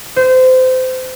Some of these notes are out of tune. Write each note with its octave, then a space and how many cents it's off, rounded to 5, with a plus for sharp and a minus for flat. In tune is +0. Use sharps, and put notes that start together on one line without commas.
C5 -25